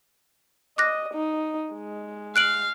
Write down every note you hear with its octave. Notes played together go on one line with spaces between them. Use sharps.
D#5 D6 F#6 A#6
D#4
G#3
F5 F#6 D7 F#7